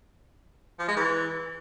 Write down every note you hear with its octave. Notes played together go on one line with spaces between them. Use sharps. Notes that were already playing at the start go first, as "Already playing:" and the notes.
F3
G#3
E3